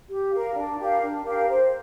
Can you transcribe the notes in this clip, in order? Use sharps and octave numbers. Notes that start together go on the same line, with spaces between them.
G4
A#4 F5
D4
G4 A#4 F5
D4
G4 A#4 F5
C5